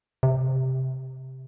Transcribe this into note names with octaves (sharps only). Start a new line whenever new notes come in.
C3